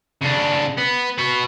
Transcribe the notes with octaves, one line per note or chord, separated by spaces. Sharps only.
C#3 D4
B3
B3 F#4